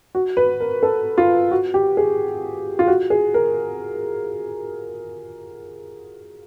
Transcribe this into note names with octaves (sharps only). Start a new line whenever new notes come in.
F#4
B4
A#4
A4
F4
F#4
G4
G#4
F4
F#4
G#4
A#4